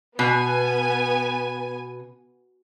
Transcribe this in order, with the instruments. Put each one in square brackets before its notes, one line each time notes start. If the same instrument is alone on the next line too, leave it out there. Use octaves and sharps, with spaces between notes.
[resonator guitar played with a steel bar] B2 [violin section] B3 G#5